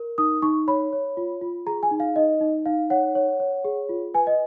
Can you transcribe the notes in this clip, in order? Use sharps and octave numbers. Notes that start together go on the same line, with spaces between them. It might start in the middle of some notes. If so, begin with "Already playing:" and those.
Already playing: A#4
D#4 D#6
D#4 C#6
C#5 B5
C#5
F4
F4
G#4 A#5
G#5
D#4
F5
D#4 D#5
D#4
D#4 F5
C#5 F#5
C#5
C#5
G#4
F4
B4 G#5
D#5